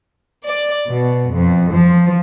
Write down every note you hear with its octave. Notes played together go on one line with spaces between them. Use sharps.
D5
B2
F2
F3